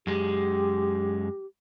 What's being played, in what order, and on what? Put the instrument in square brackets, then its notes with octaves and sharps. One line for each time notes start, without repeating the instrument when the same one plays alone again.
[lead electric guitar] F#2 G#3 [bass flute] G4